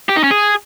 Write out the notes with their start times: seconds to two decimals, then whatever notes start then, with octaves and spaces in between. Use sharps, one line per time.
0.09 G4
0.16 D#4
0.24 C#4
0.31 G#4